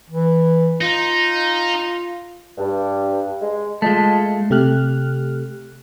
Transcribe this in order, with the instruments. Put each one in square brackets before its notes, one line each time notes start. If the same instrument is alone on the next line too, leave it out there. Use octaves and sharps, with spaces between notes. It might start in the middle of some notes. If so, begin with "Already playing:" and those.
[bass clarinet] E3
[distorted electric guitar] D#4 [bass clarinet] F4
[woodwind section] G2
G#3
[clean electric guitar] G#3 A3 [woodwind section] F4 D#5 A5
[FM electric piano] C3 A3 G4 F6 F#6